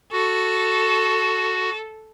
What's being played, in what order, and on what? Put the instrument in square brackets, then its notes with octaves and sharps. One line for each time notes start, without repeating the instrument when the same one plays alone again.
[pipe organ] F#4 [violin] A4